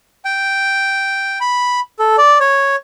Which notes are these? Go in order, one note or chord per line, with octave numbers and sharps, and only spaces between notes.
G5
B5
A4
D5
C#5